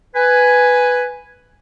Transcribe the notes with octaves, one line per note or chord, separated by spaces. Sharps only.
B4 G#5